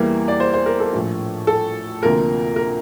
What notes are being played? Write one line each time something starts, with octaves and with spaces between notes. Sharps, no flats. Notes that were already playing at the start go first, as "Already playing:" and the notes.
Already playing: E2 E3 G3 A#3 A#4
D5
C5
C5
A#4
A4
A#1 A2 F3
A4
D2 C3 F3 A#3 A#4
A#4